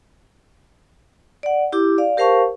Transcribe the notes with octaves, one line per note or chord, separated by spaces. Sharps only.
D5 F#5
E4 G4 D6
D5 F5
G4 A#4 C5 F5 A5 C#6